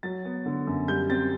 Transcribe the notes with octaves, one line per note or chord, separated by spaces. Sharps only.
F#3 A6
B3
D3
F#2
G3 G6
C4 A6